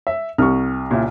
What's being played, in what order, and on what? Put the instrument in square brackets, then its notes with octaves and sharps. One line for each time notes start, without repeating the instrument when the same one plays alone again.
[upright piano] E5
[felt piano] C2 [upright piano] C#6 F6
[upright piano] A#2 C#3 E4